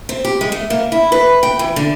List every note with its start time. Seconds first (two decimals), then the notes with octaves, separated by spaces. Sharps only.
0.09 C4
0.24 G4
0.41 G#3
0.52 A3
0.70 A#3
0.92 E4
1.12 B4
1.43 G5
1.59 E3
1.76 D3